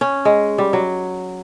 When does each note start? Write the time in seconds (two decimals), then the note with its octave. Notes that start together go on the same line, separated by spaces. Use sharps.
0.01 C#4
0.25 G#3
0.58 G3
0.73 F#3